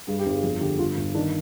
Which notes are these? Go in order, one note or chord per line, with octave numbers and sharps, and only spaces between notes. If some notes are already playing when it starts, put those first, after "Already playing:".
G2 G#4
G4
G1
G#4
F2 G#4
D3 G4
G1 F4
G1
D#3 D4